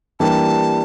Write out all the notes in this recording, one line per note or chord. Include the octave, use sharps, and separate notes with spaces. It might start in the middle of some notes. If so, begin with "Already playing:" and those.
E3 G3 A#3 D4 G4 A5